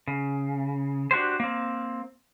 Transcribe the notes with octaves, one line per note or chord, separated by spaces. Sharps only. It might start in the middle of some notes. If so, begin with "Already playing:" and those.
C#3
D4 F#4 G4 C5
A#3 C4